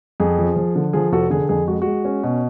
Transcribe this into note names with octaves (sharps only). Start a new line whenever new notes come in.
F2 G#4
F3
F3
D3
F3 G#4
F1 F#4 A4
D3 G#4
F2 G#4
G#3 F#4
G#3 F#4
C#4
B2